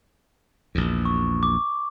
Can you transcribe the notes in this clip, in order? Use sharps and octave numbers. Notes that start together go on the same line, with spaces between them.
A#1 E2
C#6
D6